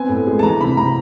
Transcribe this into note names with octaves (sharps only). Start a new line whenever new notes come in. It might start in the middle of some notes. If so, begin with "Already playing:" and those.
Already playing: B3 C4 G#5
A2
G#3
A5
E3 A#5
C3 B5
C3 A#5